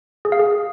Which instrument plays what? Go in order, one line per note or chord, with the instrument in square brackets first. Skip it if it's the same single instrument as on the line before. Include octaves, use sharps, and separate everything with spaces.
[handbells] G#4
F5
G#4